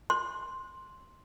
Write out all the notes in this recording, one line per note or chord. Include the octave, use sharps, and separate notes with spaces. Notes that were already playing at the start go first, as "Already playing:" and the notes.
C6